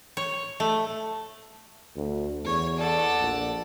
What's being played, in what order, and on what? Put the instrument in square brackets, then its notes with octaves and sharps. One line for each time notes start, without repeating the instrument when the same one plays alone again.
[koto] C#5
A3
[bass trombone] D2
[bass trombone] E2 [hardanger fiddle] C#5
[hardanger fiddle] A4 F#5 [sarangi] D5
[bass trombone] A#1